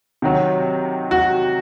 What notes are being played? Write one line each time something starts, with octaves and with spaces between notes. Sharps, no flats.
C3 D#3 F#3
F#4